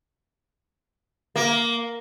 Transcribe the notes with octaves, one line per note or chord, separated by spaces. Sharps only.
A#3